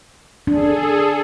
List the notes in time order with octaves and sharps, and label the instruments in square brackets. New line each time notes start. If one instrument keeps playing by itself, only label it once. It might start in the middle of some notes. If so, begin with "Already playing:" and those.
[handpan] D4 [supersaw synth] G#4 A4